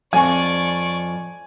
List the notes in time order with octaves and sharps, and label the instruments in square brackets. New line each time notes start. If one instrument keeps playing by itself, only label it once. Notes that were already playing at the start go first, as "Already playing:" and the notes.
[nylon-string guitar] F2 [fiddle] D5 C#6 [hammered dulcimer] G#5